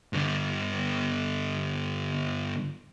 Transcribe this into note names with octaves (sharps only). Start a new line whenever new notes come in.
G2 D3